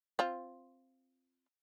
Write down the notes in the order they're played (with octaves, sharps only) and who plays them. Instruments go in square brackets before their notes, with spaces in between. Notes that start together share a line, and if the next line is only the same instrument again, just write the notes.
[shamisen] C4 F4